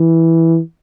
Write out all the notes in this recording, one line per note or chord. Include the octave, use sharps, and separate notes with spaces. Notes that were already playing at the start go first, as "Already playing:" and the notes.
Already playing: E3